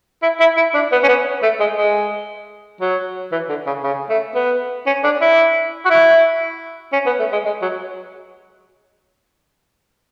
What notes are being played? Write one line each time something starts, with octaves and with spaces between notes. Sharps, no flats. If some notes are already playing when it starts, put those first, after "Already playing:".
E4
E4
E4
D4
B3
C#4
B3
A3
G#3
G#3
F#3
E3
D3
C#3
C#3
A3
B3
C#4
D4
E4
F#4
E4
C#4
B3
A3
G#3
G#3
F#3